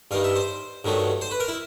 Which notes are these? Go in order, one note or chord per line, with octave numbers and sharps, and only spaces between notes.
G2 D#3 G3 F5
E5
C5
G2 D#3 F#3 A3
C5
B4
A#4
E4